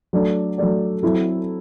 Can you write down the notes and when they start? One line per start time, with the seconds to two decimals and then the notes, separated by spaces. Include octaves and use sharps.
0.13 F#3 A3 D4 A4 D5
0.58 F#3 A3 D4 A4 D5
1.03 F#3 C4 E4 A4